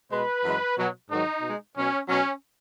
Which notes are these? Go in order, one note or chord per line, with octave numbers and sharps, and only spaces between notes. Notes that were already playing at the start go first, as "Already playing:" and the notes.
B2 G#3 B4
F#2 E3 G#3
B2 F#3
G#2 D#3 F#3 D#4
B2 G#3
B2 F#3 C#4
B2 F#3 C#4